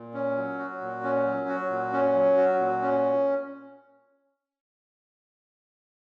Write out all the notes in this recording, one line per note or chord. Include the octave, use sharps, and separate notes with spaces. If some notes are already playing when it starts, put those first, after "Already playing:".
Already playing: A#2
C#4
F#3
F#4
A#2
C#4
F#3
F#4
A#2
C#4
F#3
F#4
A#2
C#4